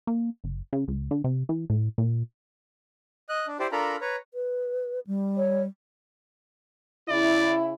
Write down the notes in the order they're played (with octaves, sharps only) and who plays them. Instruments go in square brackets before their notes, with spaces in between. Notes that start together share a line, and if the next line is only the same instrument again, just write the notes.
[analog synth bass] A#3
F#1
C#3
C#2
D3
C3
E3
A2
A#2
[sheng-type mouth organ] D#5 F#6
D4
E4 G4 C5 D5
D4 F4 A4 A#4 A#5 B5
B4 C#5 A#5
[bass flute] B4
G3
[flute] C#5
[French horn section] C#3 E4 [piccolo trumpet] D5